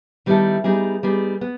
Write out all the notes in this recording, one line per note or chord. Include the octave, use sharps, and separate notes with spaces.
D#3 G3 B3 E4 A4
G3 B3 D#4 G#4
G3 B3 D#4 G#4
B3